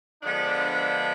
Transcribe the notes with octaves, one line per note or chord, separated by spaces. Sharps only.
D3 F3 G#3 B3 D4